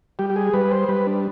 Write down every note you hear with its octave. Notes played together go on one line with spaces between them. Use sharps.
G3 G4
G4
G#4
G3 B4
C5
G3 B4
D4